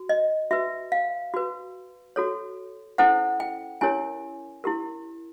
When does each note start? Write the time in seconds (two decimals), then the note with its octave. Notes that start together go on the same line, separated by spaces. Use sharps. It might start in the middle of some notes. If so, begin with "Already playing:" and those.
Already playing: F#4
0.09 D#5
0.51 F#4 B4 E5
0.92 F5
1.34 F#4 B4
2.16 F#4 A4 C#5
2.98 C#4 E4 A4 C5 F#5
3.40 G5
3.81 C#4 E4 G4 A#4 C#5 G#5
4.64 E4 G4 A#4